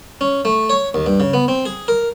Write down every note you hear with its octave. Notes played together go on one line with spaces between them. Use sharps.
C#4
A3
C#5
D#2
G2
C#3
B3
C4
G#4
A#4